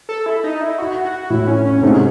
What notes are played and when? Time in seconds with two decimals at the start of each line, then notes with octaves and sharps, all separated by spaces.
0.09 A4
0.26 E4
0.44 D#4
0.61 E4
0.78 F#4
1.05 F#4
1.30 A2 E4
1.48 C#4
1.65 C#4
1.82 G#2 C3 A3
1.90 G#3